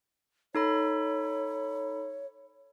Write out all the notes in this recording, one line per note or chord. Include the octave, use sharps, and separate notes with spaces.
D#4 A4 C#5 B5